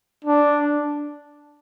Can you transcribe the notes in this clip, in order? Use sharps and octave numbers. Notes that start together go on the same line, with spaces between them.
D4